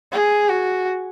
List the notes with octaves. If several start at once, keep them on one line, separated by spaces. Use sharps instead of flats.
G#4
F#4